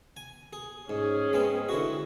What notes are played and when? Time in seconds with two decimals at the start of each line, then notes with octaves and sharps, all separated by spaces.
0.16 G#5
0.53 G#4
0.90 G#2 C#4 G#4
1.33 G#3 B3 C4
1.69 D3 E4 F#4